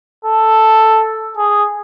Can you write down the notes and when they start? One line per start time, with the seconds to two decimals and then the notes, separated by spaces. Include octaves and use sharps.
0.25 A4
1.37 G#4